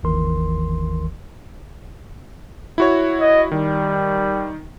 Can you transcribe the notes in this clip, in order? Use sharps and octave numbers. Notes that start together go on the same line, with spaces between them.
G1 D#2 D#3 E3 A#4 C6
E4 F#4 C#5
D#5
D#3 G3